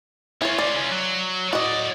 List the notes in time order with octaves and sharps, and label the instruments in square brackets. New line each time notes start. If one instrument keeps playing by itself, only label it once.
[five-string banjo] E3 C#5 [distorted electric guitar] C#4 F4
[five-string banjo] D5
[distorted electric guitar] F#3
[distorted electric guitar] A2 D5 [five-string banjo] F#4 D#5